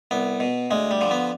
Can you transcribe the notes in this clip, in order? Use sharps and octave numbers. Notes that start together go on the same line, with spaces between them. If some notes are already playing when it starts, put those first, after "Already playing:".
C2 B3
B2
D2 G#3
G3
D3 F3
B3